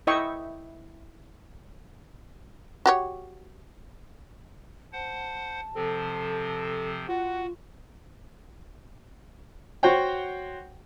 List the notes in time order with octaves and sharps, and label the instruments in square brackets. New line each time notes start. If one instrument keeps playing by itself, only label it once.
[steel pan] E4 D#5 E5 G5 C#6
[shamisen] F#4 G4 C#5
[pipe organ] C5 F#5 [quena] A5
[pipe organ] C3 F3 C4 [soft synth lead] A4
[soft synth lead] F4 [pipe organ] F#4 [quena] F#5
[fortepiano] F#4 C5 C#5 F#5 G5